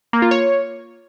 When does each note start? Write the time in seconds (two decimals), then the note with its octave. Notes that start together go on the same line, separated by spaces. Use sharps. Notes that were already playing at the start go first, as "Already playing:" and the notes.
0.13 A#3
0.22 F4
0.31 C#5